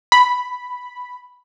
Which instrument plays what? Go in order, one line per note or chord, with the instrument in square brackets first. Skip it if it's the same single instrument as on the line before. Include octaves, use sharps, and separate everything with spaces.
[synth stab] B5